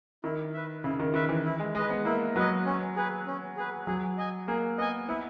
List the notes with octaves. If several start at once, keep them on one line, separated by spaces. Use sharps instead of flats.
D#3 E4
B4 E5
C#3 E4
D#3
D#3 B4 E5
E3
E4
G#3
G#3 B4 D#5
B3
A#3 E4
F#3 B4 D#5
C#4
G#4 B4
C#4
G#4 B4
F#3 G#4
D#5 G#5
A#3 G#4
B3 D#5 G#5
B3 E4